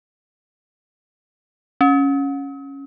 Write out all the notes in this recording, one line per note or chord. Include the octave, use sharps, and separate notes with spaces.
C#4